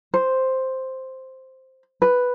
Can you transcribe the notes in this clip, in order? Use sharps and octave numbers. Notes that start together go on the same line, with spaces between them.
C5
B4